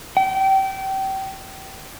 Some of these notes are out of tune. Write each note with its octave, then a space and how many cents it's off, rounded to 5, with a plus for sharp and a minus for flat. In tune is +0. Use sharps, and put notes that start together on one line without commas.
G5 -25